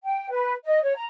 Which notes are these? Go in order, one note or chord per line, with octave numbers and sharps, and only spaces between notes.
G5
B4
D#5
C#5
A#5